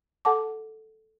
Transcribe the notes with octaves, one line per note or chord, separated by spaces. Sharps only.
A4 F#5 A5 D6